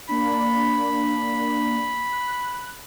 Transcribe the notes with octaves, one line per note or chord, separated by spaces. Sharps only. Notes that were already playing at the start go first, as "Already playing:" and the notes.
A#3 D4 B5
F#6